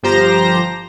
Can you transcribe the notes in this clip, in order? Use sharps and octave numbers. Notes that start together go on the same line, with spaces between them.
G1 F3 G4 C5 A#5 A#6